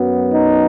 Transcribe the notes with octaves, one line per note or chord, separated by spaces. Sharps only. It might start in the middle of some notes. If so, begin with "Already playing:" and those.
Already playing: F#2 F#3 B3
D#4